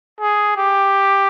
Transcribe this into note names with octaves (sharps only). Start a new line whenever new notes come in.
G#4
G4